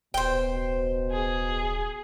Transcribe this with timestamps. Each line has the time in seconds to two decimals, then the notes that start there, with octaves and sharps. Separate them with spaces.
0.14 D1 B2 C5 G5
1.11 G#4